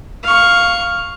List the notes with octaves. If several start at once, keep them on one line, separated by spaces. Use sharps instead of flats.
F5 C#6